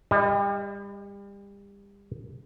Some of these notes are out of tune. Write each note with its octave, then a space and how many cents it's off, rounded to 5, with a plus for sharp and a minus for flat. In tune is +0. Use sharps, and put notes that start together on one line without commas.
G3 +35 D#5 +0